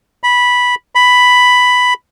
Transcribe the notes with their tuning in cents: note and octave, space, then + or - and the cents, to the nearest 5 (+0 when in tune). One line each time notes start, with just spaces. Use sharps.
B5 -10
B5 +5